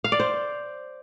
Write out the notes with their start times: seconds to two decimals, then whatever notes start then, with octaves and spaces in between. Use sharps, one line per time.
0.04 F5
0.12 D5
0.20 C5